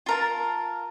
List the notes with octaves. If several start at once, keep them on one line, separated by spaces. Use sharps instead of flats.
F4 A#4 A5